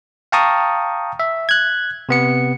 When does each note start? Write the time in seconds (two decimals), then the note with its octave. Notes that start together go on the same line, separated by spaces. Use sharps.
0.32 F5 G5 A5 A#5 C#6 D#6
1.20 E5
1.49 F#6 G#6
2.09 C3 B3 C#7